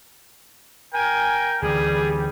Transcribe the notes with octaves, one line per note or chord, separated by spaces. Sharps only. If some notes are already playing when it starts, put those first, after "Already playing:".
A#4 G5 G#5
D2 E3 G3 G#4